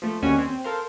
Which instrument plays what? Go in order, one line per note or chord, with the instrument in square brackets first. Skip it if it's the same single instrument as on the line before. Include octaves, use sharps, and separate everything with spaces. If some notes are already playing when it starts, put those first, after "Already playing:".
[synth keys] F3 A3
D#2 G3 C#4 F#4 C#5 G#5
C4
A4 A#4 C5 F5